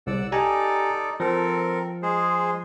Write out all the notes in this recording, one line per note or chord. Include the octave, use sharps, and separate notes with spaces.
C2 D5 F#5 E6
D#4 G4 A4 D5 G#5 A#5
F3 C4 A4 A#4
G#3 G#4 C5